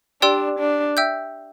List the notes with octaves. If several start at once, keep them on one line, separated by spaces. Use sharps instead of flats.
D4 G4 D5 G5 C6 E6
D4
E5 G5 E6 G6